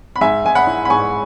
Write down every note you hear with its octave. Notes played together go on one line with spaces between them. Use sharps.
B5
G#2 E5 G#5
G#3 G#5
F#5 B5
E4
B5
G#2 G#5 C#6